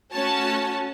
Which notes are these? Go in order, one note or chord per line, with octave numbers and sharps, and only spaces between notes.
A3 C#4 F#4 C#5 A5